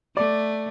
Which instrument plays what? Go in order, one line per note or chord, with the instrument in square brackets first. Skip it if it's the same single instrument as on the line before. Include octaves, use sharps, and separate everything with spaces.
[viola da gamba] A3 [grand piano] D5